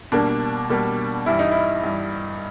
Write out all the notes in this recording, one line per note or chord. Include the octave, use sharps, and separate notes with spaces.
B2 G3 A#3 D4
B2 G3 A#3
G2 E3 G3 E4
D#4
E4
G2 E3 G3